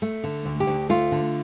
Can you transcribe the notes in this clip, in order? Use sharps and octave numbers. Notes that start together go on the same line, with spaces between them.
A3
D3
D2
G4
D2
A3 F4
D3